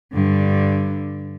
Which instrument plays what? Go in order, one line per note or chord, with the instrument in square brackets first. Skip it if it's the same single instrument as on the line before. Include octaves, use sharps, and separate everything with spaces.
[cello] G2 D3